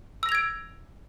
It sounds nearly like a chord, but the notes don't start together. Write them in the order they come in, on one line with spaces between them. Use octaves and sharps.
E6 A#6 F7 G#6 D7